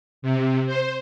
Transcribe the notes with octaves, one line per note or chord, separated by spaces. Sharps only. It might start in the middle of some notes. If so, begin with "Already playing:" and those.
C3
C5